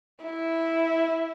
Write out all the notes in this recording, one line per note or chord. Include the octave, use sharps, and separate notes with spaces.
E4